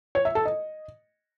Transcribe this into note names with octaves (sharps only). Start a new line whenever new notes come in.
C#5
E5
A4
D#5